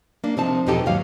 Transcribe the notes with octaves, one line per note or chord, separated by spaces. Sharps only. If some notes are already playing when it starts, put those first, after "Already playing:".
A#3 D4
C3 F3 C4 D#4 A5
E2 B2 F3 D#4 G4 A4
D#2 G#2 F#3 F5